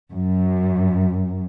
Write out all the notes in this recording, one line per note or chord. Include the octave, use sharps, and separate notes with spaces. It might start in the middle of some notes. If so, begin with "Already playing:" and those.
F#2